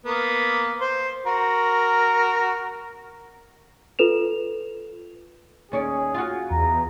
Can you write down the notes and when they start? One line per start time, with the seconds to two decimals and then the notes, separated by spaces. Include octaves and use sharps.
0.06 A#3 B3
0.81 C5
1.26 F#4 A#4
3.99 F4 A4 B4 E7 F7
5.72 D#2 C#4 G#4 D5
6.14 F4 F#4
6.51 E2 A#5